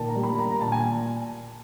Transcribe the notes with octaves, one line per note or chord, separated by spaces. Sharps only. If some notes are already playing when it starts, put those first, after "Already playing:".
Already playing: A#2 D#3 A5
A#5
G3
B5
A#3 A#5
A#5
A#2 A5
G#5